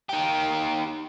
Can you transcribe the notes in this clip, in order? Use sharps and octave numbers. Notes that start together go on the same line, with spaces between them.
D#3 G4